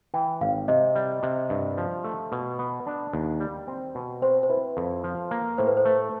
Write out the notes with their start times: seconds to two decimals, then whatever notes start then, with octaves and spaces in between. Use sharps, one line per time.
0.14 E3 G5
0.41 G#1 F5
0.68 C3 D#5
0.95 G3
1.23 C3
1.50 G2
1.78 F3
2.04 A3
2.32 B2
2.59 B3
2.87 D4
3.13 D#2
3.40 G3
3.68 C4
3.95 B2
4.22 C4 C5
4.43 C5
4.50 E4 B4
4.77 F2
5.04 F3
5.31 A#3
5.58 A2 C5
5.67 B4
5.77 C5
5.85 A3